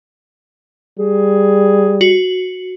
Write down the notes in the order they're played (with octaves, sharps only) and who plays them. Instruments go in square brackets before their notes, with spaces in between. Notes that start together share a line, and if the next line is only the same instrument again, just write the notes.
[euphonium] G3 [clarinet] G#4
[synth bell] F#4